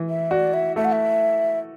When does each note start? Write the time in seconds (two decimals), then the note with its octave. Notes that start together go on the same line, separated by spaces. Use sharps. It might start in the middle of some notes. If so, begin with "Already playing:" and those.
Already playing: E3
0.09 E5
0.31 F#4 D5
0.54 E5
0.76 A3 E5
0.85 F#5
0.92 E5